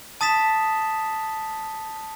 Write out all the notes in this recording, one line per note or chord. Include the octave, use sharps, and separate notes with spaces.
A5 D#6 A6 B6 E7